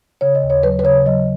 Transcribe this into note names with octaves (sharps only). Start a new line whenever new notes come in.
C#3 C#5
D#5
D#2
C#5
F#3 B4
B4
C#3 C#5
F#3 D#5